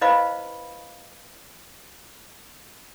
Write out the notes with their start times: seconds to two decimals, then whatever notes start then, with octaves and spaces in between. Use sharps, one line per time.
0.01 E4 B4 C5 D#5 F5 B5